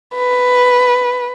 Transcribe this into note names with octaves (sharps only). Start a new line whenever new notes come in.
B4